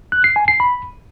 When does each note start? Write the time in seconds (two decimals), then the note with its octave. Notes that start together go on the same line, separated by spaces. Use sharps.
0.12 F#6
0.24 C7
0.36 G#5
0.48 C7
0.60 B5